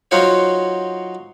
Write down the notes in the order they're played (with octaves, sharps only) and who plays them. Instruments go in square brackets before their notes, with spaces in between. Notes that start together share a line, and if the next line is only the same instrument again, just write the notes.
[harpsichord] F#3 D#4 F4 F#4 C5 C#5